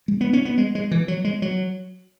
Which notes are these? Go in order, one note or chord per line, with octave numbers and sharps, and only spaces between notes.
G#3
B3
C#4
B3
G#3
G#3
E3
F#3
G#3
F#3